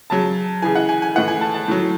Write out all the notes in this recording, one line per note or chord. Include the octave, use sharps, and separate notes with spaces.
C#3 F#3 A5
C#3 E3 G#5
F#5
G#5
G#5
A2 E3 F#5
G#5
A5
A5
A2 F#3